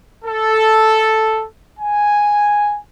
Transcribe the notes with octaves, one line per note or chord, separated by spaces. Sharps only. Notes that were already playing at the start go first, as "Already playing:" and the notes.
A4
G#5